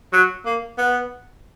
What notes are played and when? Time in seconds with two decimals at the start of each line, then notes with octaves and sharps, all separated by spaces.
0.13 F#3
0.46 A#3
0.78 B3